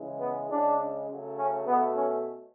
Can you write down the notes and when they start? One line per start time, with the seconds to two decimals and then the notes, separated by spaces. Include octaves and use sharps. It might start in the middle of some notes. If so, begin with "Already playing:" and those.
Already playing: C#3 E3 G#3
0.21 B3
0.49 C#3 G#3 D4
1.09 C#3 F#3 A3
1.38 C#4
1.67 B2 B3
1.72 A3
1.96 C#4